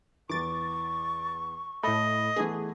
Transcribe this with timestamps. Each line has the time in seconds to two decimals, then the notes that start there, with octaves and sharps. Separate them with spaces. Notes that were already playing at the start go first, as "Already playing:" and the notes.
0.29 E2 E3 C#6 D6 A6
1.83 A2 A3 D#5 B5
2.36 E3 A3 B3 G#4